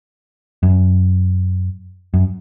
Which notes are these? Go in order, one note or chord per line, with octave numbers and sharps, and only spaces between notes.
F#2
F#2